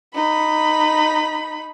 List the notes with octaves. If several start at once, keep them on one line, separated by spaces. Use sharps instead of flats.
D#4 B5